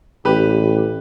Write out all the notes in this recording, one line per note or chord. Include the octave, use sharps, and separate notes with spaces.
A1 G4 B4